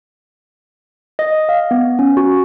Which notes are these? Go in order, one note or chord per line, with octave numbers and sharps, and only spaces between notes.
D#5
F5
B3
C#4
F#4